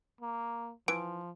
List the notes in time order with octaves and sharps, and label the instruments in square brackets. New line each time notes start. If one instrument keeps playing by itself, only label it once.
[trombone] A#3
[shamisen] E3 [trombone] F3 [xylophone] D7